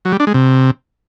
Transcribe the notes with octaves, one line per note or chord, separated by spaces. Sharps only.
F#3
G3
D4
G#3
C3